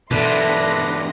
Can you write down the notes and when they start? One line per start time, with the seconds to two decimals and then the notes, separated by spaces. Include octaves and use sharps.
0.11 E2 B2 D3 D4 B4 E5 C6 A#6